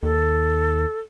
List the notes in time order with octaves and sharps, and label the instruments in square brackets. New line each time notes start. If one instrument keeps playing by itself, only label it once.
[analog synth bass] D#2 [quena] A4